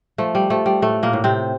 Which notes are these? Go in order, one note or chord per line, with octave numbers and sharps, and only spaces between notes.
F3 A3
G3
F3 A3
G3
A2 A3
A#2 A#3
A2
C3 C4